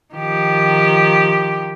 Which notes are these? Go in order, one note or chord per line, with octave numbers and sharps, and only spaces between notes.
D#3 F3 G4